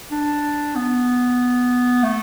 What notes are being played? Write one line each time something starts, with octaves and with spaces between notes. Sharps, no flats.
D4
B3
A3